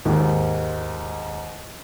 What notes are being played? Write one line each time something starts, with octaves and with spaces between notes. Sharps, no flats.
D#2 G#2